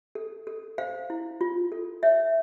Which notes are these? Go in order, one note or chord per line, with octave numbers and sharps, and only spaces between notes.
A4
A4
C5 F5
E4
F4
A4
C#5 E5